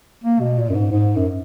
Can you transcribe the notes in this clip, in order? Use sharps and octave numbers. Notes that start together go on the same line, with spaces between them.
A#3
B2
A#2
F#2
G#2
G#2
F#2